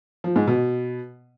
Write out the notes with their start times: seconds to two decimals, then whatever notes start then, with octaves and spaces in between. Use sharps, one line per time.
0.24 F3
0.36 G#2
0.47 B2